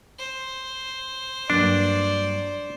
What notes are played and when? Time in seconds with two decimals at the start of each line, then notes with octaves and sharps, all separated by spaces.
0.19 C5
1.50 G2 F#3 A#3 D4 D5